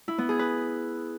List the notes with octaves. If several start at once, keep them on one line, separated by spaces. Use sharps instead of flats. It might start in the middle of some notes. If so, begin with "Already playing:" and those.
E4
B3
G#4
B4